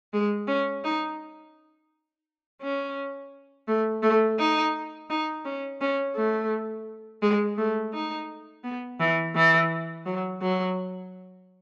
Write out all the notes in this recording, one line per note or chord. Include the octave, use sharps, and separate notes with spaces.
G#3
C#4
D#4
C#4
A3
A3
D#4
D#4
C#4
C#4
A3
G#3
A3
D#4
B3
E3
E3
F#3
F#3